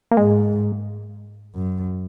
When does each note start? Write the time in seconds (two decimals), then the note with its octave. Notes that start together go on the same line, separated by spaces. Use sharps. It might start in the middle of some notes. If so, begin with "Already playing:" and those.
0.11 A#3
0.17 G#2 G#3
1.55 F#2